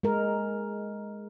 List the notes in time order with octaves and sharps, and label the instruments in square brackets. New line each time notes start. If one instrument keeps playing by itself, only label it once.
[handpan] G#3 A#4